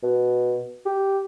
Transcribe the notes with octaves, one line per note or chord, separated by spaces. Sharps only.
B2
G4